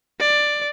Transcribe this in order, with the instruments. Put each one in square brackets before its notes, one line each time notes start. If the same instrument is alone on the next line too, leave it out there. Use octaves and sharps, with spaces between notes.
[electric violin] D5